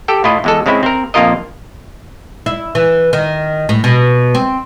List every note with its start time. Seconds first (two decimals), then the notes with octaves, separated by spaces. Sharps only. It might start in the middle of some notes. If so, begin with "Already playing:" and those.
0.08 G4 A4 G5
0.24 A2 E4 F4 D#5
0.44 E2 G#3 A4
0.66 C#3 G#3 C4 E4
0.83 C4 A#4
1.14 A#1 F2 A#3 F4 A#4 D#5
2.46 E4
2.75 E3
3.13 D#3
3.69 A2
3.84 B2
4.35 C4